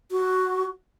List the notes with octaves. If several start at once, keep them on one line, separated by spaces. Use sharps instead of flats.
F#4